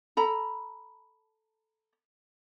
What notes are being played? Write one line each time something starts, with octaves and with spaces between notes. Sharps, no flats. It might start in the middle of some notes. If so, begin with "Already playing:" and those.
A4 A#5 B5